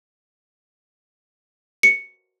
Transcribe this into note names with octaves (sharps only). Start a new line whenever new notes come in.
C#7